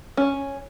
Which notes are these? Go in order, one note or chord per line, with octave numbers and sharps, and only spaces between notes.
C#4